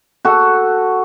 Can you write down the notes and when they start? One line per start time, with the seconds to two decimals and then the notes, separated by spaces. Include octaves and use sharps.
0.25 F#4 A4